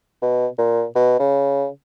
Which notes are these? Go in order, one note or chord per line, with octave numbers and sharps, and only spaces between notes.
B2
A#2
B2
C#3